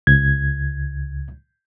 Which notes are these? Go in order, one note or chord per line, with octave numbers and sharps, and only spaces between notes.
C#2 G#6